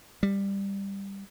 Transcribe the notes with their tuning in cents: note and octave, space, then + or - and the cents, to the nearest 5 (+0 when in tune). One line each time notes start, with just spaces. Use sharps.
G3 +10